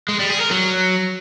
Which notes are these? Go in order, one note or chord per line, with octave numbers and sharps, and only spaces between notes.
G#3
G3
G#4
A#4
F#3